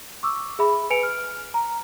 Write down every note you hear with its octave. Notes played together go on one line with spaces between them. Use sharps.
C#6 D6 E6
G#4 E5 B5
B4 G#5 C#7 D7 F7
F6
A#5